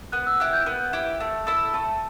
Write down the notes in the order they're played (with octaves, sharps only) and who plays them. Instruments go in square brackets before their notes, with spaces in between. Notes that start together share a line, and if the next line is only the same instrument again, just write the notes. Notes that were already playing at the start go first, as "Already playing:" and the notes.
[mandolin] B3 [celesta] F#6
[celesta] E6
[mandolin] E4 G4 [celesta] F#6
[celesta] G6
[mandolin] B3 [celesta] F#6
[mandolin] E4 G4
A3
E4 A4
[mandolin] A3 [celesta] A5